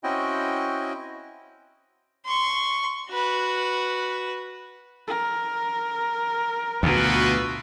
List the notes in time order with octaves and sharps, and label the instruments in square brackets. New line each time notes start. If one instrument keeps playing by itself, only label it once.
[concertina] C4 C#4 E4 F#4 D#5 G5
[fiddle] C6 C#6
F#4 B4
[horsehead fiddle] A#4
[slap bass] D2 B2 [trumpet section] F4 F#4 B4